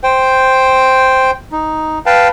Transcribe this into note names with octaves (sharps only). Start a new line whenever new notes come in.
C5 G5
D#4
B4 F5 G5 A5